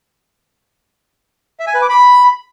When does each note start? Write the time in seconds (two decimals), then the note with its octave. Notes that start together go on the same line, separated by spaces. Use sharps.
1.60 E5
1.67 G#5
1.74 B4
1.82 D6
1.89 B5